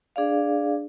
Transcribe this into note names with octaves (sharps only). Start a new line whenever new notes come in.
D4 G#4 D5 F5